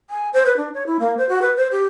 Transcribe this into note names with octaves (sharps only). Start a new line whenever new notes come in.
G#5
C5
B4
D4
C#5
E4
A#3
C5
F#4
B4
C5
G4